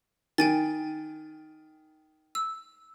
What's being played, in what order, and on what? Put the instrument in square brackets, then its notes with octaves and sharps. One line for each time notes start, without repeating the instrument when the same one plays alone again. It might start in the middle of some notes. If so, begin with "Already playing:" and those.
[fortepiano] D#3 [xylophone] G5 G#5 A6
[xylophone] E6